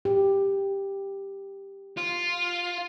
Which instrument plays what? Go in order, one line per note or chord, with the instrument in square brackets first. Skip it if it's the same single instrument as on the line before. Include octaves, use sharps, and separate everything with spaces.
[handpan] G4
[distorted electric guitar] F4